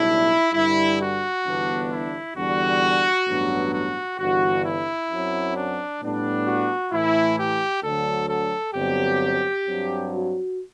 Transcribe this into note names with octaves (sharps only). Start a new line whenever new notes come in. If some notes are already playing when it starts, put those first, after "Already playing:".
Already playing: B1 A2 G3 D4 E4
G2 D3 G3 E4
F#4
G1 G2 E3 B3 D4
E4
E2 D3 G3 D4 F#4
A1 G2 F#3 B3 D4
F#4
G1 G2 E3 F#4
E4
F#2 F#3 C4
D4
A2 G3 B3 D4
F#4
A2 E3 A3 E4
G4
D2 D3 F#3 A4
A4
G1 G2 F#3 C4 G4
G2 F#3 C4
F#4